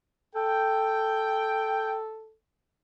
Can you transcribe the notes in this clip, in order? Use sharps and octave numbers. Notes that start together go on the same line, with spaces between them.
A4 G5